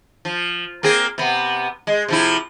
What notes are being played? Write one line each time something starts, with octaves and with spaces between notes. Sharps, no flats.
F3
A#3 C4 G#4
C3 B3
G#3
C3 F3 E4